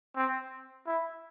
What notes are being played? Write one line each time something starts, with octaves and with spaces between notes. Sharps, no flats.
C4
E4